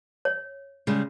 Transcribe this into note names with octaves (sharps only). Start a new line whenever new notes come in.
C#5
C#3 G3 G#3